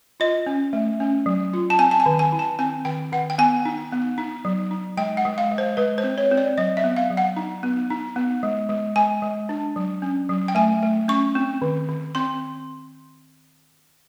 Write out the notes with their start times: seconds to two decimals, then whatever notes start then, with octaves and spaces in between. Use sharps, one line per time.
0.20 F4 D#5
0.46 C#4
0.73 A3
1.00 C#4
1.26 F#3
1.53 F4
1.70 A5
1.79 C4 G#5
1.91 A5
2.00 G#5
2.06 D#3
2.19 G#5
2.32 E4
2.39 A5
2.59 C4 G#5
2.85 D#3 G5
3.12 D#3 F#5
3.30 G5
3.38 B3 G#5
3.65 D#4
3.92 B3
4.18 D#4
4.45 F#3
4.71 D#4
4.97 G#3 G5
5.17 F#5
5.25 G#3
5.38 F5
5.52 G#3
5.58 C5
5.77 G#3 B4
5.98 C5
6.04 C4
6.18 C#5
6.31 C4
6.37 D5
6.58 F#3 D#5
6.77 E5
6.84 B3
6.96 F5
7.10 F#3
7.17 F#5
7.36 D#4
7.63 B3
7.90 D#4
8.16 B3
8.43 G#3
8.69 G#3
8.96 G#3 G#5
9.22 G#3
9.49 D4
9.76 F#3
10.02 C#4
10.29 F#3
10.48 G5
10.55 A3 G#5
10.82 A3
11.08 C#4 C#6
11.35 C4
11.62 D#3
11.89 D#3
12.15 C4 C6